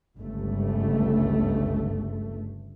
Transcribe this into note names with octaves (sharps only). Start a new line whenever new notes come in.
G1 C#2 G2 A3